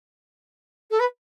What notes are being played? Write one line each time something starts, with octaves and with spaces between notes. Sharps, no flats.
A4
B4